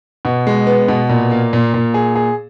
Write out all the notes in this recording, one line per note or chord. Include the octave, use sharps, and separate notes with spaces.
B2
G#3
B3
B2
A#2
A#3
A#2
A#2
G#4
G#4